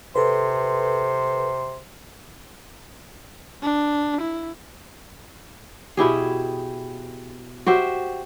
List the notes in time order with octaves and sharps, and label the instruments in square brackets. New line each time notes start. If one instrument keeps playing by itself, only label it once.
[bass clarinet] C3 [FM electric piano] A4 B4 [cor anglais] C5
[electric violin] D4
E4
[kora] B2 E4 G4 G#4
F#4 G4 C5 E5